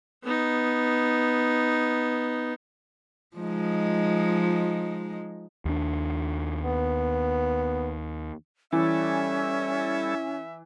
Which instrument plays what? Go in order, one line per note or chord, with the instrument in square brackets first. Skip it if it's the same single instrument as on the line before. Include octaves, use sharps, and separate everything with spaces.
[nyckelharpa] B3 D#4
[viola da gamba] F3 G#3 D#4
[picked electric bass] D#2 D4
[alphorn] B3
[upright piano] E3 [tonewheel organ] G3 E4 A4 [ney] C#4 [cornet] E5